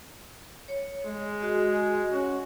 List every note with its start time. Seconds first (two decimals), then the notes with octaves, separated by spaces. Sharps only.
0.68 C#5
1.05 G#3
1.42 F#4 D#5
2.12 C#4 F#4